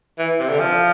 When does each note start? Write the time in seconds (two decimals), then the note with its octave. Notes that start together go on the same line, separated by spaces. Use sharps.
0.19 E3
0.39 C3
0.49 D3
0.59 F3